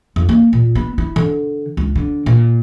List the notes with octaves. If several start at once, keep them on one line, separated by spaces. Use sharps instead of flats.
F2
A#3
A#2
B3
E4
D3
C#2
D3
A#2